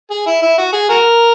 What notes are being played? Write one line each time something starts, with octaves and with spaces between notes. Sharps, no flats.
G#4
E4
E4
F#4
G#4
F#4 A#4